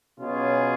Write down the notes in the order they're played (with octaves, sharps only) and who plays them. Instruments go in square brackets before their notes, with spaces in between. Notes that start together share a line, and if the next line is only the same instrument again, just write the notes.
[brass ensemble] B2 F#3 C#4 F4 G#4